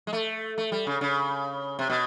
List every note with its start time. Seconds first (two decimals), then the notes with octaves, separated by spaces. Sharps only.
0.07 G#3
0.13 A3
0.58 A3
0.72 G3
0.87 C#3
1.01 C#3
1.79 C3
1.90 B2